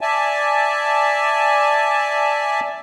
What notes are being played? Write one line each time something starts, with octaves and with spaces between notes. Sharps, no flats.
D5 E5 G#5 A5